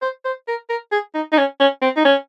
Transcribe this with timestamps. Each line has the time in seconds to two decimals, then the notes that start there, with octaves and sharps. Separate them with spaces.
0.02 C5
0.25 C5
0.48 A#4
0.69 A#4
0.92 G#4
1.14 D#4
1.32 D#4
1.38 C#4
1.60 C#4
1.82 C4
1.96 D#4
2.05 C#4